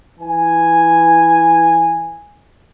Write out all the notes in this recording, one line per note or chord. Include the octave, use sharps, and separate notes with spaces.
E3 G#5